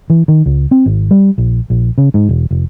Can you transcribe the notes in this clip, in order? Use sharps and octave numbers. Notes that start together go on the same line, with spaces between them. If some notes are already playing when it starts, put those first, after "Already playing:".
E3
D#3
C#2
C4
G#1
G3
A#1
A#1
C#3
G#2
E1
F1